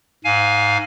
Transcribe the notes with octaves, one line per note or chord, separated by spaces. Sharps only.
G#2 F5 G#5